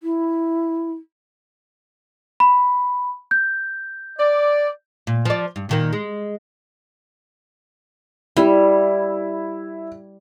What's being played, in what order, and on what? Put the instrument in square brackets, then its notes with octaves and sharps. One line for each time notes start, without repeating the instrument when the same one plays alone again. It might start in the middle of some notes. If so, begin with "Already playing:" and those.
[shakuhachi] E4
[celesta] B5
G6
[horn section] D5
[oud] A#2
F3 D5
G2
A#2 D#3 A#3
G#3
[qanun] G3 [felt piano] E4